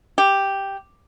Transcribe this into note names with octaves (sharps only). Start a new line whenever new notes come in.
G4